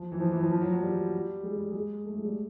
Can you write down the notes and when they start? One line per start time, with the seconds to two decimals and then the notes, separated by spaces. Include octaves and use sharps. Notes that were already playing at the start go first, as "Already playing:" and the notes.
Already playing: F3
0.12 E3
0.20 F3
0.31 E3
0.41 F3
0.51 F3
0.61 F#3
0.72 F#3
0.82 G3
1.43 G#3
1.57 G3
1.70 G#3
2.05 A3
2.14 G#3
2.25 G3